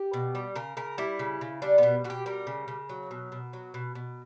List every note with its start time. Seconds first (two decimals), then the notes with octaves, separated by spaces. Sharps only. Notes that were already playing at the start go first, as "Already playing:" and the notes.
Already playing: G4
0.13 B2
0.35 G3
0.55 C#3 A#4
0.77 C#3 A#4
0.98 G3 E4
1.19 C#3
1.41 C#3
1.62 G3 D4
1.78 B2 B3
2.04 B2 F#4
2.10 G4
2.26 G3 A#4
2.47 C#3
2.68 C#3
2.89 F#3
3.11 B2
3.32 B2
3.53 F#3
3.74 B2
3.95 B2